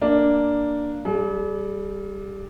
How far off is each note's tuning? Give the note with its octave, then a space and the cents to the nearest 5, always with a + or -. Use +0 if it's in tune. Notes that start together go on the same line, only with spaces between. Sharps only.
A#3 +0 D4 +0
G3 +0 G#4 +45